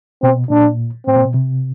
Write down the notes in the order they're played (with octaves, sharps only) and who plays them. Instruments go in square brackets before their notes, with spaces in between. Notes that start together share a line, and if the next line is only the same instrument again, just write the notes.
[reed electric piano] B2 [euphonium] C4
[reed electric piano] A#2 [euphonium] D4
[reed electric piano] A2 [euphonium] C4
[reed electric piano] A#2
B2
C3